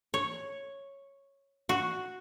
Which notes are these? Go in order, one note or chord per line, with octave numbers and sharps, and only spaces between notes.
C#5
F#4